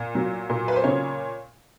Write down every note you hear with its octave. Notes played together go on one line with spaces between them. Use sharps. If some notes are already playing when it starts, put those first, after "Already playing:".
Already playing: A#2
F#3
A#2
B4
C5
C#3 C#5